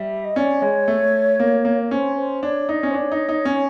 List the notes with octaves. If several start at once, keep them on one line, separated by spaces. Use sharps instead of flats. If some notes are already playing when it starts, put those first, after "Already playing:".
Already playing: G3 E5
D#5
C#4 D5
G#3 C#5
A3
A#3
A#3
C#4 C5
C5
D4 C#5
D#4 D5
C#4
C5
D4 C#5
D#4
D#4
C#4